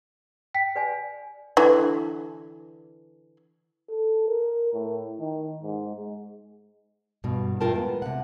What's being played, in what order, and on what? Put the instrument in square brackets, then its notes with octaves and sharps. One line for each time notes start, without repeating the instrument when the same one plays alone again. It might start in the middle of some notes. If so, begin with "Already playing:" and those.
[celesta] G5 B6
[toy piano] B4 D5 G#5
[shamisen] D3 E3
[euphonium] A4
A#4
A2
D#3
G#2
G#3
[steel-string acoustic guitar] G2 B2
E2 A#2 F4 A#4 G5 A5
G#3 B3
C3 F#5